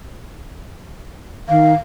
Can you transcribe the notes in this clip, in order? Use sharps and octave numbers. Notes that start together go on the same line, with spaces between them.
D#3 F5